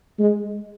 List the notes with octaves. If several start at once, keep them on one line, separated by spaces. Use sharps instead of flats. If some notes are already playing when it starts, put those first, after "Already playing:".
G#3